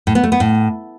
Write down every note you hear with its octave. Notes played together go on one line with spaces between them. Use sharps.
A2
B3
A3
B3
A2